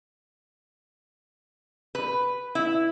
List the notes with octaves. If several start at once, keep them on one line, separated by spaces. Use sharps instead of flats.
B4
E4